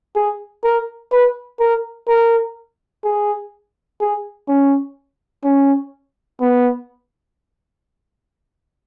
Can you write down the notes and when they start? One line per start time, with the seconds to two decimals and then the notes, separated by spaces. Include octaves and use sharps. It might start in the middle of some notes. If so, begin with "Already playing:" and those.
0.16 G#4
0.64 A#4
1.12 B4
1.60 A#4
2.08 A#4
3.04 G#4
4.01 G#4
4.48 C#4
5.44 C#4
6.40 B3